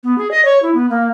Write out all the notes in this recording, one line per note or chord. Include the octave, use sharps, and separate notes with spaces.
B3
G#4
D#5
C#5
E4
B3
A#3